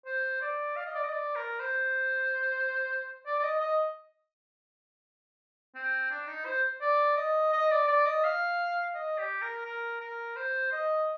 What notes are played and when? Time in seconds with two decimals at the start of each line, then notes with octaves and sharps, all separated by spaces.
0.06 C5
0.41 D5
0.76 F5
0.86 D#5
0.94 D5
1.04 D#5
1.12 D5
1.36 A#4
1.60 C5
3.26 D5
3.39 D5
3.43 D#5
3.61 D#5
5.75 C4
6.11 D4
6.27 D#4
6.45 C5
6.81 D5
7.17 D#5
7.53 D#5
7.71 D5
7.88 D5
8.06 D#5
8.24 F5
8.95 D#5
9.18 G4
9.42 A#4
9.65 A#4
10.01 A#4
10.36 C5
10.72 D#5